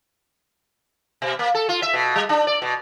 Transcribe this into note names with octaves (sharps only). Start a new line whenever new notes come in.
B2
A#3
A4
F4
E5
B2
G3
D4
D5
B2